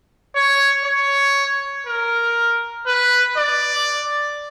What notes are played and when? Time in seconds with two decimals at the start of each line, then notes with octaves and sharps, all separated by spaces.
0.36 C#5
0.85 C#5
1.87 A#4
2.87 B4
3.37 D5